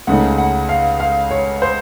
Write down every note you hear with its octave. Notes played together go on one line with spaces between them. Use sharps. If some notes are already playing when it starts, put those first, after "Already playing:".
C#2 C#3 A3 D#4 F#5
F#5
F5
F5
C#5
C5